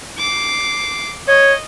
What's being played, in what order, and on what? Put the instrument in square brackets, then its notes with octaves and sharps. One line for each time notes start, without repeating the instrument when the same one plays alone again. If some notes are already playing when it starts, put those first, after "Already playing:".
[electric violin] D6 C7
[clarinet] C#5 [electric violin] D#5